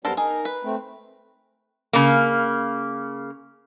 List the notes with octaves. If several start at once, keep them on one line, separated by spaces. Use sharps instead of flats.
F#2 G3 B3 A4 A#4 C5
D#4 G#4 A#4
B4
A3 C4
C#3 A#3